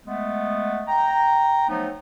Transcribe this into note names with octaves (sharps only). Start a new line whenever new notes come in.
G#3 A3 B3
G5 A#5
F3 F#3 A3 B3 D#4